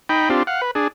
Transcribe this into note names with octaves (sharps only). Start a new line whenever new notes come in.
D#4 G5 B5
C4 D4 F4 G4
F5 F#5
B4
D4 G#4